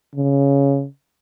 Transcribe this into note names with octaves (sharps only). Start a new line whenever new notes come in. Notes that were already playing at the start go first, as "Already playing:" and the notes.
C#3